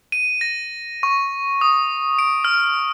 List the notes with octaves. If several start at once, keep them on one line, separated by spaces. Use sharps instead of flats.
D#7
A#6
C#6
D#6
D7
F6